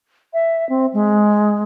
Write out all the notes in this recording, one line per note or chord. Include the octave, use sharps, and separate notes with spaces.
E5
C4
G#3